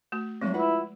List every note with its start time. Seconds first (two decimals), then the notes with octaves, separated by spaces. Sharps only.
0.12 A3 F#4
0.41 F3 F#3 G#3 A3 C4
0.54 E4 F4 B4 F#5